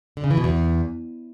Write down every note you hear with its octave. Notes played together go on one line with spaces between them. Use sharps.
D3
C#3
E3
B2
E2